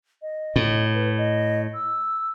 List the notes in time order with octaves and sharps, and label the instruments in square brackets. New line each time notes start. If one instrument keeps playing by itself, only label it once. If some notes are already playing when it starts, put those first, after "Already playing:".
[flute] D#5
[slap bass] A2
[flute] B4
D#5
E6